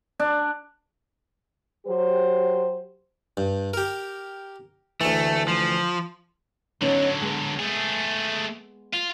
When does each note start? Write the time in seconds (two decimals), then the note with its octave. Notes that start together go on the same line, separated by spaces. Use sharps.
0.20 D4
1.86 F#3 G4 C5
3.37 G2
3.74 G4 A#4
5.01 D2 E3 A3
5.48 F3
6.81 D3 F#3 B3 C#4 D#4
7.21 G#3 B3
7.59 A3 G#4
8.94 F4